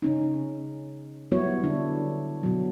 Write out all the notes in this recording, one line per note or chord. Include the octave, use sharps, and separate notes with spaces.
C#3 C#4 D#4
F#3 G3 B3 E4 F#4 C#5
D3 D4 E4
B2 F#3